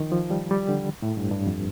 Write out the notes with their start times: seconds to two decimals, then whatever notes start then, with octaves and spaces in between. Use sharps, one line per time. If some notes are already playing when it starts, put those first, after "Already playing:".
Already playing: D#3 F3
0.12 F3
0.30 G3
0.51 G3
0.69 D3
1.02 A2
1.17 G2
1.32 G2
1.46 F2